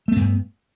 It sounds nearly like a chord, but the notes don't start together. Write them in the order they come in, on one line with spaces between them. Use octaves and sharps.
A3 B3 G2